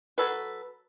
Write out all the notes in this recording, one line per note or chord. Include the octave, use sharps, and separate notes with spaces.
F#3 A4 B4